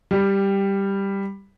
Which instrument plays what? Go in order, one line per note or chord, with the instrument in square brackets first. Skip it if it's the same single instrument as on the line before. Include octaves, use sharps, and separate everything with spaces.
[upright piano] G3